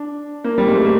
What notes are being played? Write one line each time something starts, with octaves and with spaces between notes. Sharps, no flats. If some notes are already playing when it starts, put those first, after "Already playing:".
Already playing: D4
A#3
G3
G#3
A3
A#3